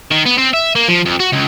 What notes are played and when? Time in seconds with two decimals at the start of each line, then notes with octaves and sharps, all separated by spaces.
0.11 D#3
0.26 B3
0.38 C4
0.54 E5
0.76 A#3
0.88 F3
1.05 F2
1.19 F#4
1.32 C#2